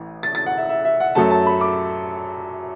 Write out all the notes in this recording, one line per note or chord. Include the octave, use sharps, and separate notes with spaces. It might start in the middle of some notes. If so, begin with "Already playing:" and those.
Already playing: A1 A2 E3
A6
A6
F#5
E5
E5
E5
F#5
F#2 F#3 A3 A5
A5
B5
D6